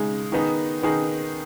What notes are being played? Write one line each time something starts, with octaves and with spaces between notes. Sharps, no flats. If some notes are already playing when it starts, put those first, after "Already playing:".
Already playing: C#3 G#3 D#4 G#4
D#3 B3 D#4 G#4
D#3 B3 D#4 G#4